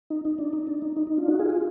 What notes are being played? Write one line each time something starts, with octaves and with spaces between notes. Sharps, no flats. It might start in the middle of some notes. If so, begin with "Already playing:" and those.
D#4
D#4
D4
D#4
D4
D#4
D#4
D#4
D4 F4
D#4 F#4
F4 G#4
F#4
F4 G#4